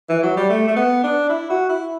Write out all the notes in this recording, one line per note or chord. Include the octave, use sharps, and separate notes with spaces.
E3
F#3
G3
A3
A3
B3
D4
E4
F#4
E4